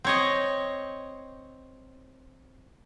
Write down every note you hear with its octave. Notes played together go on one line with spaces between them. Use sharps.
C4 C#5 D#5